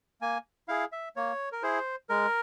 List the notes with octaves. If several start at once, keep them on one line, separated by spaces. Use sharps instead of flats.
A#3 G#5
E4 G#4 F5
E5
A#3 C#5
A#4
E4 G#4 C5
G#3 A#4